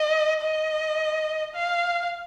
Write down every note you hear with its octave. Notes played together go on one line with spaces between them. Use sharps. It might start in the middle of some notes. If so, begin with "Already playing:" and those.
Already playing: D#5
D#5
F5